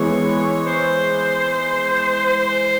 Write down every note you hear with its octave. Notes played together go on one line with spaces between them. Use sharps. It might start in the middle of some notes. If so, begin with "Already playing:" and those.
Already playing: E3 G#3 B3 C#5
C5
C5